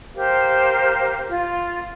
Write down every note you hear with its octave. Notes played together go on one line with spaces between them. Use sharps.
G4 A#4 C5 F5
F4